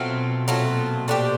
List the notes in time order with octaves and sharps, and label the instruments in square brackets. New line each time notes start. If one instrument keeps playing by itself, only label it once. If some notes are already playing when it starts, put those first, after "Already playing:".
Already playing: [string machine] B2 [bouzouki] F#3 A3 C4 F4
[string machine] A#2 [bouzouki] F#3 A3 C4 F4
[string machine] B2
[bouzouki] A3 D4 G4 C5